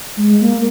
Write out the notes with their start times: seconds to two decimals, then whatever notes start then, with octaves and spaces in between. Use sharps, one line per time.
0.17 G#3
0.41 A#3